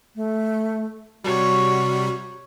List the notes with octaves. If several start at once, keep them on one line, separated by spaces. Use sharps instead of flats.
A3
C3 G3 F#4 C#5